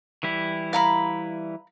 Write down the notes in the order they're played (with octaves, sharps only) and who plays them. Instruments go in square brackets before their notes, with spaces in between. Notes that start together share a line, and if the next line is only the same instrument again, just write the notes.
[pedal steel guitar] E3 G3 E4
[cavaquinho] F5 A#5 B5